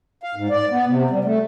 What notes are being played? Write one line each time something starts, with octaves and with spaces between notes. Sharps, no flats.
F5
G#2
D5
B3
C3
G3
A3